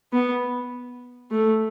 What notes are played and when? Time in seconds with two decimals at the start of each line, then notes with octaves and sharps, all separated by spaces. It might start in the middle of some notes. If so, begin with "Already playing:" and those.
0.13 B3
1.32 A3